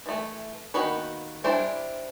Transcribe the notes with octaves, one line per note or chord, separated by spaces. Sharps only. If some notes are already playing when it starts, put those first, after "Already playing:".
E3 A3
D#3 A#3 B3 F#4 B4
G3 D4 E4 C5 G#5